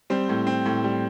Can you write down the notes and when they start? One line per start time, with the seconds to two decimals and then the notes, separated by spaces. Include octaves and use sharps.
0.10 G3 C4 C5
0.29 A2
0.47 C4
0.66 A2
0.84 G3